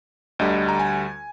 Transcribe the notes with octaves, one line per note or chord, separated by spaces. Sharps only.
D2 D3 G3 D#5
A#5
G#5